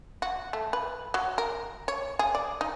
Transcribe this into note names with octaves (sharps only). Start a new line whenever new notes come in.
F#4
A3
B4
F#3
A#4
C#5
G#4
D5
D#4